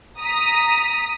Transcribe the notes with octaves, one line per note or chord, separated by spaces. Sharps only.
A#5 D#6 B6